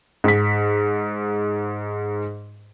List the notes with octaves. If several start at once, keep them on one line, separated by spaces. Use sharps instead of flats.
G#2 B6